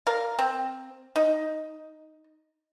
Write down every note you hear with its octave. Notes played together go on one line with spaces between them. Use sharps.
A#4 D5 F5
C4
D#4